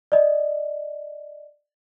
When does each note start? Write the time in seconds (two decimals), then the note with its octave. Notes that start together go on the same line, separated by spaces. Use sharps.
0.12 D5 D#5